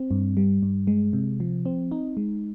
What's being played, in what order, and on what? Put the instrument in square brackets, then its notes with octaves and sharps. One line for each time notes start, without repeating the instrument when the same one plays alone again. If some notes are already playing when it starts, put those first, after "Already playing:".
Already playing: [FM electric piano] C4
G2
G3
G2
G#3
C3
F3
C4
D#4
G#3